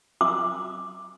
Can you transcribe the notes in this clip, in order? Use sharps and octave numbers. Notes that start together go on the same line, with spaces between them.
D6